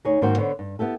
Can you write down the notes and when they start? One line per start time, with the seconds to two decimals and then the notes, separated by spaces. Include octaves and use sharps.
0.05 D2 D#4 G#4 C#5
0.21 G#2 D#3 A#3 F#4 C5 G5
0.37 D3 B3 C5 C#5
0.59 G2
0.79 B3 E4 G4 A4